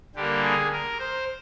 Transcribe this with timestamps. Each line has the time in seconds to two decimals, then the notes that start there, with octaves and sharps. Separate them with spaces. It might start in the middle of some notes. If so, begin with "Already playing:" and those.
0.15 D3 G3 A#3 G4
0.43 G#4
0.72 A#4
0.99 C5